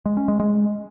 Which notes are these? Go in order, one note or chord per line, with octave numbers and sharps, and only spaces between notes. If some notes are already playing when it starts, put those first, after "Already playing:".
G#3
C#4
G#3
G#3